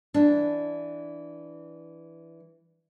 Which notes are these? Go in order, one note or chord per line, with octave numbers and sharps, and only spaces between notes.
E3 D4